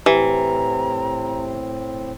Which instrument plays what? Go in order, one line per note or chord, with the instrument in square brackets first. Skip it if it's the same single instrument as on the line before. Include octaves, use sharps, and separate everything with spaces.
[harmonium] A2 C4 [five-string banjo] E3 [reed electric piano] G4 [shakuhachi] A#5